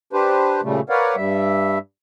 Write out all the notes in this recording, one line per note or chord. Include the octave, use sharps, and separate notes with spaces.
D4 G4 B4 C5
A#2 C#3 G3 A3
A#4 B4 C#5 D5 F5 F#5
G2 G3 E5